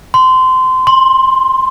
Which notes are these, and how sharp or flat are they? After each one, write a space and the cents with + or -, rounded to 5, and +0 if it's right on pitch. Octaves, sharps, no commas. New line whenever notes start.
C6 -20
C6 +15